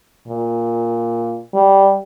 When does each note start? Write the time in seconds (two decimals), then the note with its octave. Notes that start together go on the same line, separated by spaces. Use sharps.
0.28 A#2
1.54 G3